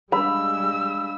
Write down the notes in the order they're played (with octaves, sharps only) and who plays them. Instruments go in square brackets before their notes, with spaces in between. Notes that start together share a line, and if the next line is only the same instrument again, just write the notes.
[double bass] G3 G#3 [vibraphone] D4 F5 [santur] B5 [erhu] E6